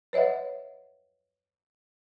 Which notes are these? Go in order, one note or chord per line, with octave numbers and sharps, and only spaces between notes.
B4 C#5 D#5 E5 F#5